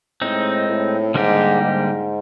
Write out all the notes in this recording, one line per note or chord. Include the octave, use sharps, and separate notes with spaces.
A2 G#3 C4 D#4
A2
G#2 D3 G3 A#3 D#4 G4
G#2